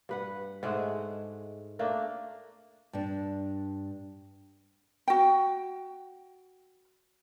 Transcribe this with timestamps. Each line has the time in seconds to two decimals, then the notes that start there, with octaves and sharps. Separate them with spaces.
0.09 G2 B4 F#5
0.63 G#2 G#3 A3 F#5
1.79 A3 A#3 D4
2.93 G2 D4
5.08 F#4 G5